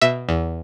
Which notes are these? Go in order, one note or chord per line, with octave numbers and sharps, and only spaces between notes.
B2 E5
E2